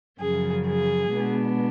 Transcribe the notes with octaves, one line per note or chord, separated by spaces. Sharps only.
F#2 C#3 F3 G#4
G#4
B2 G#3 B3 D4